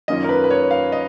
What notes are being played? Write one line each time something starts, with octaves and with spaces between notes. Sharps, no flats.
F#2 D#3 A#3 C#4 F4 D#5
A#4
B4
B4
C#5
F5
D#5